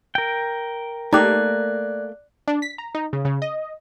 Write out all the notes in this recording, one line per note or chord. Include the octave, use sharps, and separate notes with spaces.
A#4 G5
A3 A#3 D#4 G4 D5 F#6
D4
B6
A#5
D#4
C#3
C#3
D#5